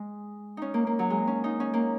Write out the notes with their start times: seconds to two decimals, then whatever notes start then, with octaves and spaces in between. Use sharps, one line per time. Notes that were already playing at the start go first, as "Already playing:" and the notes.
Already playing: G#3
0.57 C#4 D#4
0.74 A#3
0.87 A#3
0.99 F#3
1.10 G#3
1.27 C#4
1.44 D#4
1.60 C#4
1.73 A#3